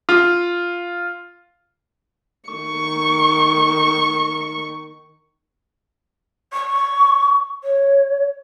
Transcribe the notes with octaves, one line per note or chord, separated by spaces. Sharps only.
F4
D#3 C#6
C#6
C#5